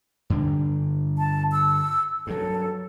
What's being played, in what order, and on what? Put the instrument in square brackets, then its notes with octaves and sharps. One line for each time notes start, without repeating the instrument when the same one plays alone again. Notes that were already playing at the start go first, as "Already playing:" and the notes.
[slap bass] G2 D3 D4
[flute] A5
E6
[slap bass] G2 F#3 [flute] A4